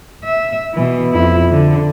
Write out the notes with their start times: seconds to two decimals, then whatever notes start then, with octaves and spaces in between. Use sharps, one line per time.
0.25 E5
0.74 B2 E3
1.12 F2 E4
1.51 D3